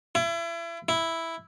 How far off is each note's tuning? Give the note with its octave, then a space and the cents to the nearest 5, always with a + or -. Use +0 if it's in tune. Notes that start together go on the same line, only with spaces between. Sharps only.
E4 +35
E4 +0